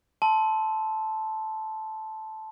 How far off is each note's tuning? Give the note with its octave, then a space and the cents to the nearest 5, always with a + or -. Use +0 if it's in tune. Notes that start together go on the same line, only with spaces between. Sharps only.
A5 -10 C6 -10 E6 -10